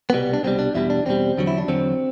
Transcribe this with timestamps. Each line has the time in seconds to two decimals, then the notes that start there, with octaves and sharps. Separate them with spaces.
0.10 C2 B2 G3 B3
0.34 D4
0.43 C2 B2 G3 C4
0.59 D4
0.74 E2 B2 G3 E4
0.90 D4
1.06 E2 B2 G3 C4
1.37 E2 D3 F#3
1.47 E4
1.58 D4
1.68 E2 D3 F#3 C4